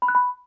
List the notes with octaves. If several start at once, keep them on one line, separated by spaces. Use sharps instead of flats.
B5
F#6
B5